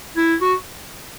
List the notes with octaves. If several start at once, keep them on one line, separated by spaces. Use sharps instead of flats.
E4
F#4